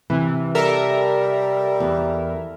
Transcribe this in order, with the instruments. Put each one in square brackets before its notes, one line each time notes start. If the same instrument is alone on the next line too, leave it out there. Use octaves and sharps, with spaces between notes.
[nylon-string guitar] C3 [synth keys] E3
[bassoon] G3 [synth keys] A4 A#4 E5
[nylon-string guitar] E2